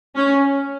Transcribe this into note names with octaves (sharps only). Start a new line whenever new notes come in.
C#4